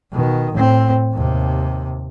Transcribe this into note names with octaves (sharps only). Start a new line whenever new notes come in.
B2 D#3
A2 C4
D#2 C3